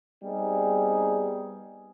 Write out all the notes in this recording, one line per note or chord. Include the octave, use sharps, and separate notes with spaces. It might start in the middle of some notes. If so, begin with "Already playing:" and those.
G3 B3 C4 D#4 G#4